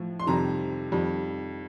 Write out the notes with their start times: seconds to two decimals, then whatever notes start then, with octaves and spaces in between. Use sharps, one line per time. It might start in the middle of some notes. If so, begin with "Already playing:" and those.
Already playing: A2 F3
0.20 C6
0.27 F2 C3 D#3 G3 A#5
0.91 F2 D#3 G3